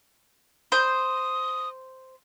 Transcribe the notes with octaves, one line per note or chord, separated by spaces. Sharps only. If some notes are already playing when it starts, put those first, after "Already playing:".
C5 D#6